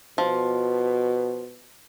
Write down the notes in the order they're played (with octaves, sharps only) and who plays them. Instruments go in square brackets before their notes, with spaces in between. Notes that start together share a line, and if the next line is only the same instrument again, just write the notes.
[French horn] B2 [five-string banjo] F3